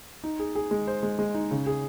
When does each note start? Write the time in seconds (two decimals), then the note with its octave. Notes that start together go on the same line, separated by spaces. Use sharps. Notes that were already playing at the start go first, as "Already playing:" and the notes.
0.24 D#4
0.39 G#4
0.55 G#4
0.71 G#3
0.87 C5
1.03 G#3
1.19 G#3
1.34 D#4
1.51 C#3
1.67 G#4